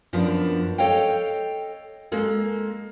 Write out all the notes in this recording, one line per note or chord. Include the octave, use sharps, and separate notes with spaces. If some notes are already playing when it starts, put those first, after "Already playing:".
F#2 F3 A#3 B3 D4
A4 C#5 D#5 F5 G5
G#3 A#3 A4